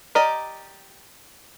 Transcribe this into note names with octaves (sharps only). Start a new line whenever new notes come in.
G4 A#4 D5 D#5